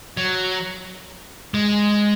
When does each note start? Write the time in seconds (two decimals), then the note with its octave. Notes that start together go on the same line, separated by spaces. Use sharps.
0.17 F#3
1.54 G#3